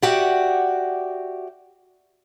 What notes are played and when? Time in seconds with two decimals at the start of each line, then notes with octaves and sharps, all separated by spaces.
0.02 F#4 G4 D5 E5 F#5